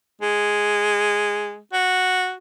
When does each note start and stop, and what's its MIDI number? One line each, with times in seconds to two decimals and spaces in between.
0.22 1.58 56
1.73 2.33 66